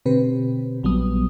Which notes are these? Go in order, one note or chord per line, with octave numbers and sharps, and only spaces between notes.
B2 D3 C4 G4 B4
A#1 F#3 G3 B3 D#6